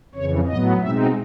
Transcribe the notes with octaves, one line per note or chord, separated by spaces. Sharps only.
F2 C#3 E3 C#5
A2 F#3 B3 D#5
B2 G#3 C4 D#4 E5